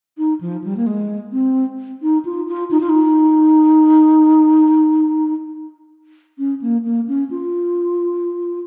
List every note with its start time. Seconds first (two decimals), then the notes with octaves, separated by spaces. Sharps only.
0.18 D#4
0.41 F3
0.64 G3
0.77 A#3
0.87 G#3
1.32 C4
2.02 D#4
2.25 F4
2.48 F4
2.71 D#4
2.80 F4
2.89 D#4
6.38 C#4
6.62 A#3
6.84 A#3
7.08 C#4
7.31 F4